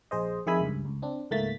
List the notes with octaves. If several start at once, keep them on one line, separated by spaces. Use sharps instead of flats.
A#1 G#4 C5 D#5
F2 D#3 G#4 E5 G#5 B5
C#2 G2
C#2
C4 D4
C#2 G#2 A3 A#3 A6 B6